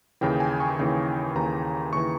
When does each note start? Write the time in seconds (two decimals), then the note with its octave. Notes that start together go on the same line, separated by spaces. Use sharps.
0.21 D#2 C#3 E3 G5
0.40 G#5
0.60 C#6
0.79 D#2 C#3 E3
1.35 D#2 C#3 E3 A#5
1.93 D#2 C#3 E3 C#6